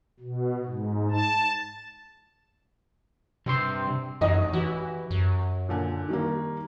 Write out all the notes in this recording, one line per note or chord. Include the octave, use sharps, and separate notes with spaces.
B2
G#2
A5
G2 C3 C4 C6
A1 F#2 D#4 D#5
E3 F#4 G4
F#2
A#2 D3 G#5
D#3 G3 A#3